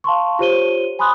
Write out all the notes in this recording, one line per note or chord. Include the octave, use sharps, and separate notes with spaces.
F5 A5 C6 C#6
F4 G4 C5 C#5 D#7 G7
G#5 B5 C6 D#6 F#6